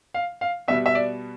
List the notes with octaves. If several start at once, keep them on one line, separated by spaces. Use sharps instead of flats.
F5
F5
B2 G3 B3 E5
E5
D5